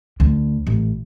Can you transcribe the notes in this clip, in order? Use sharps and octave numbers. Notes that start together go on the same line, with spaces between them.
D2
A1